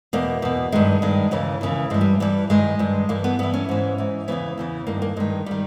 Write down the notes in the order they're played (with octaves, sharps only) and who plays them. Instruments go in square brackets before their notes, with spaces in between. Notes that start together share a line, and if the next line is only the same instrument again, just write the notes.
[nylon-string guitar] E2 B2 A#3
E2 B2
G2 D#3 G#3
G2 D#3
D#2 C#3 E3
D#2 C#3 E3
G2 E3 G#3
G3
G2 E3 G3
G2 D#3 G#3
G2 D#3
G2 E3 A#3
B3
G2 E3 B3
C#4
G#2 E3
G#2 E3
E2 C#3 E3 B3
E2 C#3 E3
G2 D#3 A#3
A#3
G2 D#3 G#3
D#3 G3